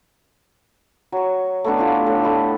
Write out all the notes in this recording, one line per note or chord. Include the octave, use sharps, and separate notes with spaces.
F#3 C#6
A3 B3 D4
E4 F4 G4
A2
E4 A4 D#5